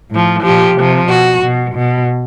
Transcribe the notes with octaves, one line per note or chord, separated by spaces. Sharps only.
A2 F3
A#2 F3 G4
C3 F3
B2 F#4
B2
B2